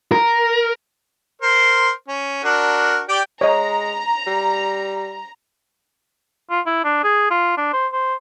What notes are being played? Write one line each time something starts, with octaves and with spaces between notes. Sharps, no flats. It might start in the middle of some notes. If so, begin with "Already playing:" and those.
A#4
A#4 C5
C#4
D4 F#4 A#4
G4 D5 G5
G#3 C#5 D#5 A#5
G3
F4
E4
D4
G#4
F4
D4
C5
C5